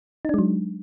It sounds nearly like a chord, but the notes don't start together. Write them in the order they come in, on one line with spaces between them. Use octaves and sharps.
D#4 D4 G#3 F#3